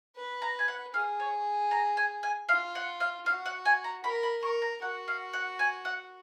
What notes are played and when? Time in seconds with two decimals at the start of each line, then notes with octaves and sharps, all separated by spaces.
0.16 B4
0.42 A#5
0.59 G#5
0.68 F#5
0.93 G#4 F5
1.20 C#5
1.71 A#5
1.97 G#5
2.23 G#5
2.49 F4 F5
2.75 F#5
3.00 F5
3.26 F#4 F5
3.46 F#5
3.65 G#5
3.84 A#5
4.04 A#4 B5
4.23 B5
4.43 A#4 C#6
4.62 A#5
4.82 F#4 F#5
5.08 F5
5.33 F#5
5.59 G#5
5.85 F#5